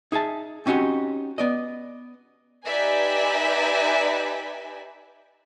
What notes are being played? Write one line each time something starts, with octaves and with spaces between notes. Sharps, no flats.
D#4 G#4 E5 A5
C4 C#4 D#4 F#4 G4
B3 D5 D#5
D#4 G4 B4 D5 E5 G#5